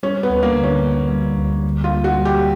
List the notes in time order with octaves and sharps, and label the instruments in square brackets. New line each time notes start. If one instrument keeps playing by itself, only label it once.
[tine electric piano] G3 [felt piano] C#4
[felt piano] B3
[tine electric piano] D2
[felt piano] A#3
[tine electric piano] D3
[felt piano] C#4
[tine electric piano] A#3
G3
D2
D3
[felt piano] F4
[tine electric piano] A#3
[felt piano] F#4
[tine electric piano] G3
[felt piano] G4